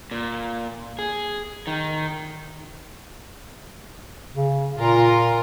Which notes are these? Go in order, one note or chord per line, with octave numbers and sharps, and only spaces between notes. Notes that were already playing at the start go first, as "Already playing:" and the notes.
A#2
G#4
D#3
C#3
A#2 F4 A#4